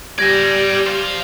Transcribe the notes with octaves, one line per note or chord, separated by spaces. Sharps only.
G3 D5 G#5 G#6 A#6
C5 F5